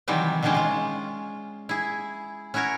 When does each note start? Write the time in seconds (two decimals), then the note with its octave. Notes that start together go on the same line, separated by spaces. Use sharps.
0.08 C3 D#3 E3 F#3 G3 C4
0.42 B2 D3 D#3 G3 G#3 C#4
0.55 G#3 F4
1.69 E4 G#4
2.54 C#4 E4 F#4 A#4 C#5